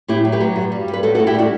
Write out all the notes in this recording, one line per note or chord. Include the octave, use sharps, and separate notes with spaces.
A2 E4 G4
F#3
G4 B4
F#3
G2
G3
G2
B4
A2 F#4 A4
A2 F#4 A4
E4 G4
G3 D4 F#4